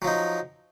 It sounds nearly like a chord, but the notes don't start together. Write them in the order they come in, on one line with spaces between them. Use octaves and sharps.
F#3 F3 D#4